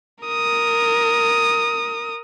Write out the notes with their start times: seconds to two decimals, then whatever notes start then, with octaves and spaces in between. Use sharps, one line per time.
0.25 A#4 D#6